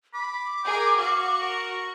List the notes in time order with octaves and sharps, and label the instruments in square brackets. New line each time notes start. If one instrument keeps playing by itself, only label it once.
[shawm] B5 [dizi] D6
[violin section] G#4 A#4 [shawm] G5
[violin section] F#4 C#6 [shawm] F5
[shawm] A#4